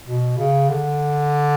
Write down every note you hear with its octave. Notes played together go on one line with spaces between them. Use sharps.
B2
C#3
D3